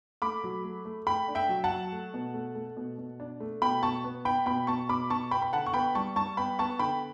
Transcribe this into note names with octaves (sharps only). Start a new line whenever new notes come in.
A3 B5 D6
F#3
A3
A3
A3 G5 B5
D4
E5 G5
F#3
F#5 A5
F#3
A3
B2
A3
A3
B2
B2
D4
A3
B2 G5 B5
B2 A5 C#6
B3
B3 G5 B5
B2 G5 B5
B2 A5 C#6
B2 B5 D6
B2 A5 C#6
B3 G5 B5
B5
D3 F#5 A5
C#6
B3 G5 B5
G3 A5 C#6
G3 A5 C#6
B3 G5 B5
B3 A5 C#6
D3 G5 B5